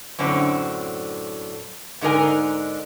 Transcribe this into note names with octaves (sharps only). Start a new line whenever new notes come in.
F#2 A2 D3 C4
G#2 D3 D#4 A#4 G#5